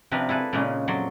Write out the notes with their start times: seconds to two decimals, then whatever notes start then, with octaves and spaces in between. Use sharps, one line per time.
0.11 C3 F3 C4 D4 A#4 B4
0.29 E4 G#4 A4 B4
0.53 A#2 C#3 G#3 C#4 D#4 G#4
0.88 F2 F#3 C#5 D5 C6